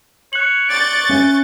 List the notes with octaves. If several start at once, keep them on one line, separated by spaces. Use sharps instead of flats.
C#5 F#6 F#7
D5 C#6 G6 A6
C#4 E5